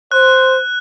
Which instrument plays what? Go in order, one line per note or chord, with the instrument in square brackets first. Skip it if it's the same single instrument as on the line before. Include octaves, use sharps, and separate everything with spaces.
[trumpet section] C5 [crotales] F#6